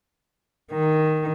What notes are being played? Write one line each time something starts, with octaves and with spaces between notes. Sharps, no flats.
D#3